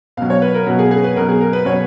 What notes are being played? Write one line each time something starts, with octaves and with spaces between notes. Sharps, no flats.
B2 F#3 F5
C#5
B4
A#4
B2 F#3 F#4
G#4
G#4
B4
B2 F#3 A#4
G#4
A#4
B4
B2 F#3 C#5